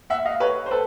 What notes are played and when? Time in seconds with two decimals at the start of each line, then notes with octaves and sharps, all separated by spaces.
0.10 E5 F#5
0.25 D#5 F5
0.40 B4 C#5
0.66 C5
0.71 A4 B4